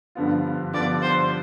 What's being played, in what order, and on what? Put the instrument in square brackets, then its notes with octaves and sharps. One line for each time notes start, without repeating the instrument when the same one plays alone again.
[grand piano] G2 D3 F3 B3 F4
[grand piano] G2 D3 F3 B3 F4 [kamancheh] D5
[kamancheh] C5